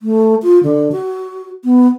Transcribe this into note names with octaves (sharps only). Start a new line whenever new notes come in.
A3
F4
D3
F#4
B3